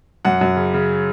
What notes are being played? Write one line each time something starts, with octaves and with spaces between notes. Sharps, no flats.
F#2 F#5
F#2
C#3
C#3